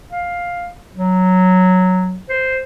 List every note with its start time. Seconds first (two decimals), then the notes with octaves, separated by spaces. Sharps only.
0.10 F5
0.93 F#3
2.29 C5